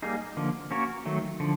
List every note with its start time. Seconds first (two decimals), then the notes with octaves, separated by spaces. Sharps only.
0.02 G3 A#3 D#4 G#4
0.37 D3 F3 A#3
0.71 A#3 C#4 F#4 A#4 C#5
1.06 D#3 F#3 A3
1.40 D3 F3